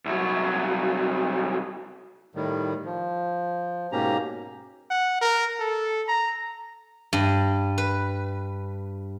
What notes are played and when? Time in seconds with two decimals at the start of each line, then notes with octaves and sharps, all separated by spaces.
0.06 C2 F#3
2.35 A2 D#3 G3
2.85 F3
3.92 G#2 B2 A#3 C#4 G4 A#5
4.91 F#5
5.21 A#4
5.60 A4
6.08 A#5
7.13 G2
7.78 B4